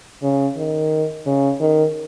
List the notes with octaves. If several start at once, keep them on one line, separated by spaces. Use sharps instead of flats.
C#3
D#3
C#3
D#3